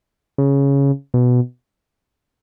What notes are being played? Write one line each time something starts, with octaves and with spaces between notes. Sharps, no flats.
C#3
B2